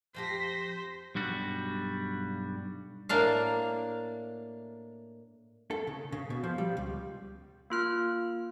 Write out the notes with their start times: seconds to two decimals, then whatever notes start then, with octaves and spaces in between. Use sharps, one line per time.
0.15 F2 F3 G4 C5 A#6 B6
1.15 B1 G2 G3 F#4
3.09 A2 A#3 D4 F5
5.71 A4
5.87 C#3
6.12 C#3
6.30 B2
6.44 F3
6.58 G3
6.77 C#2
7.70 A#3 F4 F6